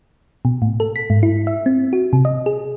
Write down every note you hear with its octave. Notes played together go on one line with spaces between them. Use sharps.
B2
A2
A4
B6
G#2
E4
E5
C4
F#4
C3
D#5
G#4